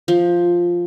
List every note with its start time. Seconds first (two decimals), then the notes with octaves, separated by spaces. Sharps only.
0.08 F3